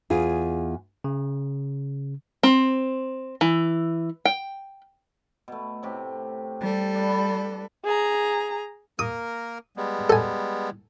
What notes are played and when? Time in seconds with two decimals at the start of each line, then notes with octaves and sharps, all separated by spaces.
0.10 E2 F4 G#4
1.04 C#3
2.43 C4
3.41 E3
4.25 G5
5.48 B2 A3
5.83 A2 C3 G4
6.60 G3 A4
6.95 D4 B4
7.84 G#4 A#5
8.99 A#3 A#4 D#6
9.77 G3 G#3 B3
10.10 A4 G#5